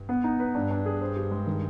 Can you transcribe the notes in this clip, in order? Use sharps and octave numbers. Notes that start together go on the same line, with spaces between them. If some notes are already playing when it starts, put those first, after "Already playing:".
Already playing: G2
B3
D#4
B4
G2 D4
D4
G#4
C5
G4
G#3
D#3